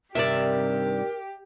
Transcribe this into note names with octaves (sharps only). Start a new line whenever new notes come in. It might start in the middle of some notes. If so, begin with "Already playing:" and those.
G2 C3 D#3 G4 A#4 D5 E5